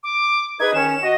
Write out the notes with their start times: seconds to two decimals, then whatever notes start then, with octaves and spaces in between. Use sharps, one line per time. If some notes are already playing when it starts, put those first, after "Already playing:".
0.03 D6
0.60 D#4 G#4 B4 G#6
0.74 D#3 C#4 E7
1.01 F#4 D#5